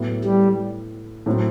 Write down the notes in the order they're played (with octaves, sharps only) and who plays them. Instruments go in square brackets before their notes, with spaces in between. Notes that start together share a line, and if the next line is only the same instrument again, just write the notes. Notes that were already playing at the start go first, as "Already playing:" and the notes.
Already playing: [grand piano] A2 F#3 B3 E4
[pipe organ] G3
[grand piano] A2 F#3 A3 C4